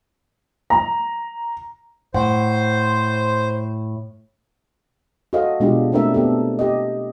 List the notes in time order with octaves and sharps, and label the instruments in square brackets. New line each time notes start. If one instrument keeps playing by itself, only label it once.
[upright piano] A#5
[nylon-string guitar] A2 F#5 [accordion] C5
[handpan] F#4 A4 C5 D#5 F5
B2 G#3 D4 F4 G4
A3 C4 D4 A#4 E5
B3 C4 G4 A4
G4 D#5